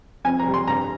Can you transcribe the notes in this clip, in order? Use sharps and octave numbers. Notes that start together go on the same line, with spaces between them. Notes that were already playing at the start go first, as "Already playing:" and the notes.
F2 G#5
A#5
C3 G3
C6
G2 A#5